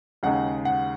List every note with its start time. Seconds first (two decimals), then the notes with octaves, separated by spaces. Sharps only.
0.23 D#2 C#3 G#3 D#4 F#5
0.65 F#5